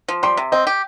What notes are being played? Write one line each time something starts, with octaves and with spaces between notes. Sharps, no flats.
F3
G3 C6
C3
C4 D#5
G4